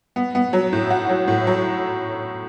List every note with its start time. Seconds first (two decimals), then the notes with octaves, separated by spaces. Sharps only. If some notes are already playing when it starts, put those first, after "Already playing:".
0.16 B3
0.35 B3
0.53 F#3
0.73 A2
0.90 F#4
1.09 F#3
1.28 A2
1.47 F#3